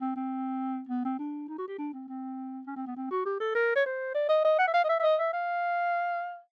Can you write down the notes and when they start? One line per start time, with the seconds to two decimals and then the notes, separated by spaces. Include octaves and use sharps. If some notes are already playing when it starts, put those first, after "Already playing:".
0.01 C4
0.16 C4
0.89 B3
1.05 C4
1.19 D4
1.48 D#4
1.58 F#4
1.68 G4
1.78 D4
1.93 C4
2.08 C4
2.67 C#4
2.76 C4
2.87 B3
2.96 C4
3.11 F#4
3.26 G4
3.40 A4
3.55 A#4
3.75 C#5
3.86 C5
4.14 D5
4.29 D#5
4.44 D#5
4.59 F#5
4.68 E5
4.74 F5
4.84 D#5
4.89 E5
4.99 E5
5.03 D#5
5.19 E5
5.33 F5